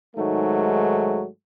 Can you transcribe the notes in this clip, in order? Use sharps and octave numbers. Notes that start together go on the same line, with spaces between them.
G#2 D#3 F#3 G#3 A3